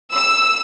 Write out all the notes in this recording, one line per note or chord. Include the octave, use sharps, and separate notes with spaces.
E6